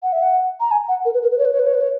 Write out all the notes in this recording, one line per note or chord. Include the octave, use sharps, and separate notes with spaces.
F#5
E5
F#5
A#5
G#5
F#5
A#4
B4
A#4
B4
C#5
B4
C#5
B4
C#5
B4
C#5